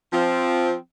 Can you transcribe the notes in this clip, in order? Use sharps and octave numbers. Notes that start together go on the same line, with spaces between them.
F3 C4